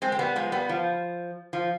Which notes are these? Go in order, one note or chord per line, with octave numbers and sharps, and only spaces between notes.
G#3 C4
C4
G3 B3
F3 G#3
G3 B3
F3
F3